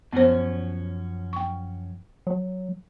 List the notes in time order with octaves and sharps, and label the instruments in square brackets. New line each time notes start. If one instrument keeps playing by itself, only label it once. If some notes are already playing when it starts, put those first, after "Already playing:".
[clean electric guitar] F#2 F3 C#4 [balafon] B3 C5
[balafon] G5 C#6
[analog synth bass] F#3